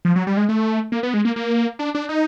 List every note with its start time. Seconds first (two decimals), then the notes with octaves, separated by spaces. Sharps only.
0.05 F3
0.16 F#3
0.27 G3
0.37 G#3
0.49 A3
0.92 A#3
1.03 B3
1.14 G#3
1.25 A#3
1.36 A#3
1.79 D4
1.95 D4
2.09 D#4